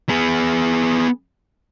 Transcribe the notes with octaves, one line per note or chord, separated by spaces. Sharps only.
B3 G#4